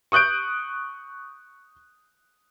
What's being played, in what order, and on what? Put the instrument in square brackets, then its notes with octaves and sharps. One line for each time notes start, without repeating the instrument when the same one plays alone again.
[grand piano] C#6 D#6 F#6 G6 D7